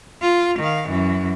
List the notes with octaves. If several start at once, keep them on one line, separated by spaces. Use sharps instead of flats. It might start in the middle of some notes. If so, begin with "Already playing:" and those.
F4
D#3 F5
F#2 E3